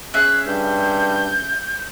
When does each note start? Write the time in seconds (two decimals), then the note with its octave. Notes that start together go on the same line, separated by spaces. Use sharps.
0.14 C#4 G#4 E5 F#6
0.46 G2 G6